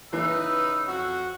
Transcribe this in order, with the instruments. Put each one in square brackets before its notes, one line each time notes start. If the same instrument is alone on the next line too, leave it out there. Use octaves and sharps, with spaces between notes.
[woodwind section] C#3 E6 [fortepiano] E3 [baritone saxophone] D#4 [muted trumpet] B4
[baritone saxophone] F2 [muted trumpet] F#4